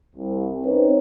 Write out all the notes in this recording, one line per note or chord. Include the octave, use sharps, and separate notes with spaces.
C2
C4 C#4 D#4 B4 C#5